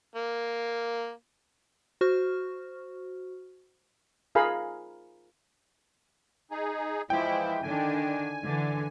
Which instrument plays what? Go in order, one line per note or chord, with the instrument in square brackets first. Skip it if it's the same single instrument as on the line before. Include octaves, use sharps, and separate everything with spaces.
[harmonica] A#3
[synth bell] F#4 C5 C#6 F6
[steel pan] F4 G#4 A#4 F5 G#5 B5
[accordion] D#4 G#4
[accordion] E3 F3 G#3 [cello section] E4 [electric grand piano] G5
[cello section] D3 D#3 D4 [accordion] G#5
[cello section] D3 E3